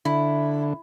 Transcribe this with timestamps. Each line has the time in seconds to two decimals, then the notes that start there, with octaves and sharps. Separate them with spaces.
0.05 D3 E4